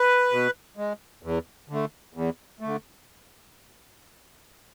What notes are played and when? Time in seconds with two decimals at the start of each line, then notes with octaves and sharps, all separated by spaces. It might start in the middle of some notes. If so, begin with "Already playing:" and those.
Already playing: B4
0.31 B2
0.77 G#3
1.23 E2
1.69 D3 A3
2.14 E2
2.61 D3 A3